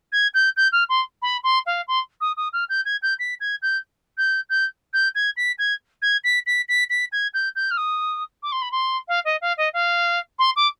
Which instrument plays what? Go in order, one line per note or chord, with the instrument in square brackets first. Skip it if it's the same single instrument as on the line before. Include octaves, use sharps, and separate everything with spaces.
[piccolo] G#6
G6
G6
F6
C6
B5
C6
F5
C6
D#6
D#6
F6
G6
G#6
G6
B6
G#6
G6
G6
G6
G6
G#6
B6
G#6
G#6
B6
B6
B6
B6
G#6
G6
G6
F6
D#6
D6
C6
B5
C6
F5
D#5
F5
D#5
F5
C6
D6